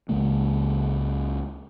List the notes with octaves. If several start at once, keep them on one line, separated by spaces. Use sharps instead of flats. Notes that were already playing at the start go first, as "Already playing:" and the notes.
C#2 C#3 G#3 A#3